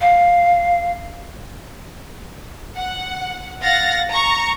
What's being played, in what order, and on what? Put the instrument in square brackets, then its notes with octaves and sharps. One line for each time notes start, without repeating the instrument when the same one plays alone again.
[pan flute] F5
[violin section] F#5
F5 F#5 A6 A#6
A#5 C#6